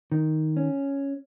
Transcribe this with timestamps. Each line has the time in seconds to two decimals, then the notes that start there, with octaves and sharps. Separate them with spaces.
0.12 D#3
0.57 C#4